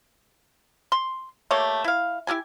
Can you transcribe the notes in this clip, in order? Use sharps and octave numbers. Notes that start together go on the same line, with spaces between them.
C6
A3 A#3 G4 C#5
E4 F5
E4 F4 G4 G#5